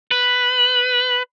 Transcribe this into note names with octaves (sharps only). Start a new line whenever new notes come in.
B4